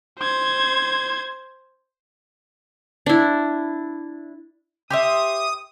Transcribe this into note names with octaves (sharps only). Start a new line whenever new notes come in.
C5 G#6
D4 E4
G4 C5 E5 D#6